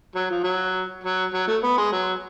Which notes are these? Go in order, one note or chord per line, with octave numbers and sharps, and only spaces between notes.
F#3
F3
F#3
F#3
F#3
A3
B3
G#3
F#3